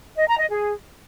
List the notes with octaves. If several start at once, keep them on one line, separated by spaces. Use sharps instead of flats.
D#5
A#5
D#5
G#4